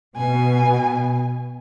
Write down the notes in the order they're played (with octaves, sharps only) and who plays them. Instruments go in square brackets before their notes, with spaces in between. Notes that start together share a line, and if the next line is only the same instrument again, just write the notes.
[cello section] B2 [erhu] G#5